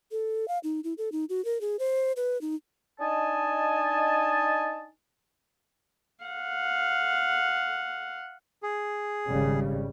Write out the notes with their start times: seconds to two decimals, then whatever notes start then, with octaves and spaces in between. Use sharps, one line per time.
0.11 A4
0.48 F5
0.63 D#4
0.84 E4
0.98 A4
1.12 D#4
1.30 F#4
1.45 A#4
1.61 G#4
1.79 C5
2.16 B4
2.41 D#4
3.00 D4 D#4 D#5 G#5 A5
6.24 F5 F#5
8.63 G#4
9.28 G#1 C#3 G3